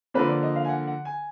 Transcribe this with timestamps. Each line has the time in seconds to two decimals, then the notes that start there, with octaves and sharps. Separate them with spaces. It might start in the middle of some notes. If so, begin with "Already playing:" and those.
0.14 D3 F3 A#3 B4
0.29 D5
0.43 D#5
0.56 F5
0.65 G#5
0.69 F#5
0.87 F#5
1.05 G#5